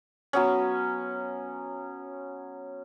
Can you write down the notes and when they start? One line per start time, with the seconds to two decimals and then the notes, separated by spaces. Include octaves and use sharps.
0.33 F#3 B3 C#4